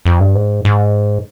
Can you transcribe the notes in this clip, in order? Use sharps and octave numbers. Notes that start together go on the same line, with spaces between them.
F2
G2
G#2
G#2